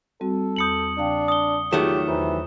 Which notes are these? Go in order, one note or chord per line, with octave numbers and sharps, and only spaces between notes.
G3 C4 F#4 A4
E2 B5 D#6 G6 C#7 F#7
C#3 D4 F5 G5
D#6 G7
D#3 F#3 A3 F4 G4 G#4 E7
E2 E3 C5 A#5